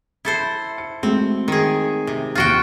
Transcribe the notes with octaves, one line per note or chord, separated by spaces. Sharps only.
E4 A4 C5
C#7
G#3 A3 C4 F#4
D#3 G#4
C3
D#1 F4 F#4 G5 F#6